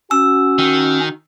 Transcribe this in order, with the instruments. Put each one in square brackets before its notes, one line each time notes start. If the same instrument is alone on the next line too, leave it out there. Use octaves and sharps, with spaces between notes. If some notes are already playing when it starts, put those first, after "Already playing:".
[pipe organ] C#4 [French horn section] F#4 [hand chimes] E6
[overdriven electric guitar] D#3